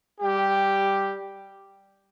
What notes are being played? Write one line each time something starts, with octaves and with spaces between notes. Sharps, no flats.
G3 G4